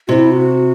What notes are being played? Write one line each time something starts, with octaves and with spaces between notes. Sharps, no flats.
C3 E4 F#4
F#4